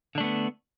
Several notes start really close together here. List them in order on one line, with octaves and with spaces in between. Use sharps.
D3 D4 A3 B3